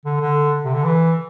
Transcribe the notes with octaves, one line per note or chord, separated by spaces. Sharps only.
D3
D3
C3
D3
E3